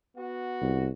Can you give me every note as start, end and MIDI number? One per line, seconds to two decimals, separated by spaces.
0.16 0.85 59
0.16 0.85 66
0.61 0.90 36